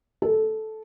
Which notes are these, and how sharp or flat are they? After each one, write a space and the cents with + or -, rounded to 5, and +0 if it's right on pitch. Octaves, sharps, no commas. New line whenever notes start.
A4 -10